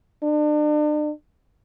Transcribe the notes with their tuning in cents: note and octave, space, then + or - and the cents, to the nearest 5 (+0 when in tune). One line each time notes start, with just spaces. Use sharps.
D4 +40